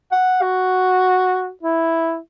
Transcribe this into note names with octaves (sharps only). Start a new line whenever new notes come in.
F#5
F#4
E4